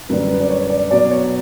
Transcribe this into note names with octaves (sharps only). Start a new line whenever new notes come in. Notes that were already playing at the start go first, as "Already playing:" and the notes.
F#2 D3 G3 B4
B4
D5
C#5
D5
B2 F#3 D5
C#5